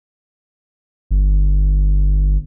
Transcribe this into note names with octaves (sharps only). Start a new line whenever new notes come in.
G1